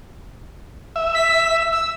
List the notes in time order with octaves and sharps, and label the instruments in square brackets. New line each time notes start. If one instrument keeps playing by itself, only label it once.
[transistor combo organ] E5
[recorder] B6
E6